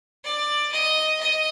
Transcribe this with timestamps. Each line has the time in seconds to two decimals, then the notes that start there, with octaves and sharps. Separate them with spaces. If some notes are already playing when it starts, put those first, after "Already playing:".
0.24 D5
0.72 D#5
1.20 D#5